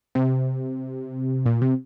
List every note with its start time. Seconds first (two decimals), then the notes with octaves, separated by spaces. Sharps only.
0.15 C3
1.46 A#2
1.62 C3